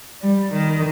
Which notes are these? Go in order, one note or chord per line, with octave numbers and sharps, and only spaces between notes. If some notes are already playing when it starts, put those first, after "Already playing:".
G3
D#3